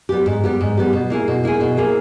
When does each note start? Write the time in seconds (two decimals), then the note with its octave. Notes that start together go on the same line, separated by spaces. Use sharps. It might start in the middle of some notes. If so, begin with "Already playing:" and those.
0.09 G3 B3 G4
0.26 G#2
0.44 G3 B3 G4
0.61 G#2
0.77 G3 B3 G4
0.93 B2
1.10 A#3 E4 G#4
1.28 B2
1.44 A#3 E4 G#4
1.60 B2
1.77 A#3 E4 G#4